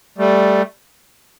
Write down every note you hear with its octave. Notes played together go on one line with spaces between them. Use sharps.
G3 A3